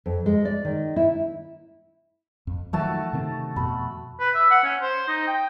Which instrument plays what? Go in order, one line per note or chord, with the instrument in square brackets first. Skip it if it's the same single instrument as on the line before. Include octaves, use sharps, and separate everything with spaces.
[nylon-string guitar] F2
G#3
D5
D#3
E4
[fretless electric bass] F2
[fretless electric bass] D#3 F3 F#3 [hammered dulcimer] A3 F#4 A5
[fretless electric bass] C3 D#3 C4
[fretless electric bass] F2 B2 [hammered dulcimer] B5
[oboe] B4
E5
F#5
C#4
C5
D#4
G5